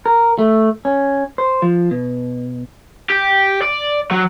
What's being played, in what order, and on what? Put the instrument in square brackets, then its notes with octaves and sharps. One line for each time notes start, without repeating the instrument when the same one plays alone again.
[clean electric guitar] A#4
A3
C#4
C5
F3
B2
[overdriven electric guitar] G4
D5
F#3